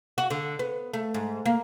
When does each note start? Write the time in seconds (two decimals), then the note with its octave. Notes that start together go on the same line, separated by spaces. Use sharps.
0.18 F#4
0.30 D3
0.59 B3
0.93 A3
1.14 G#2
1.46 A#3